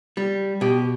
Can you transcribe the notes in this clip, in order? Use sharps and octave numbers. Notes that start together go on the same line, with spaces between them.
G3
B2 G4